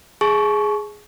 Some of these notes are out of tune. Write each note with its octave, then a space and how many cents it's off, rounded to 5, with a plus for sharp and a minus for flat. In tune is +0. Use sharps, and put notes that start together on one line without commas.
G#4 +5 A5 -40 C#6 +0